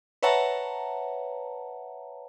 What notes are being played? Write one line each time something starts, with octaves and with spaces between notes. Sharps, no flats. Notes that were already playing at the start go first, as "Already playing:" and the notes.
B4 C#5 E5 F#5 A5 A#5